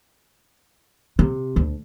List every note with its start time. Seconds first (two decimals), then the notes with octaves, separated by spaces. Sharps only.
1.19 C3
1.56 D2